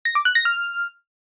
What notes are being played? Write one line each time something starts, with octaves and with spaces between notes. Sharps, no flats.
A#6
D6
F#6
A#6
F6